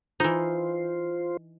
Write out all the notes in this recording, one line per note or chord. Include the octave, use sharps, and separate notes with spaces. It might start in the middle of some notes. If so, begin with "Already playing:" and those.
E3 D#4 F4 C5